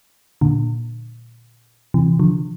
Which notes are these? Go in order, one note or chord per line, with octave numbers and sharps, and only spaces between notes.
A#2 D3
C3 E3
D3 F3